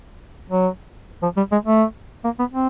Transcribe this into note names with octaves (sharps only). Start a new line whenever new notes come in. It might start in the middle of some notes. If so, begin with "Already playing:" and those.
F#3
F3
G3
G#3
A3
A#3
B3
C4